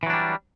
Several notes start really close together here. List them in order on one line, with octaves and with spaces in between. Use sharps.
E3 F#3 D4 G3